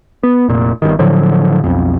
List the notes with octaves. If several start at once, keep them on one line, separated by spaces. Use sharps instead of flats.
B3
F1 A#2
G1 G2 D#3
A2 D3 F3 F#3
B1 F2